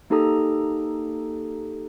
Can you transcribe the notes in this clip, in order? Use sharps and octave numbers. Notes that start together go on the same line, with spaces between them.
A#3 D#4 G4 A4 A#5 D#6